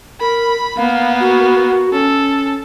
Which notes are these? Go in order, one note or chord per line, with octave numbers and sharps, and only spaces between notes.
A#4 B5
A#3 B3 F5
F#4
C#4 A4